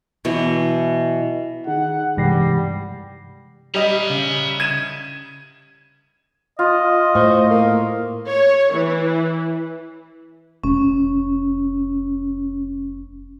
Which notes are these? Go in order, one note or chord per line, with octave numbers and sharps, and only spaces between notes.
B2 E3 F#3
D#3 D#4 G#4 F#5
G2 C3 E3 G3 G#3 A#6 C7
G3 D#5 E5 A#5
C#3
G#6 D#7 E7
F4 D#5
A2 C5 C#6
A#3
C#5
E3
F1 C#4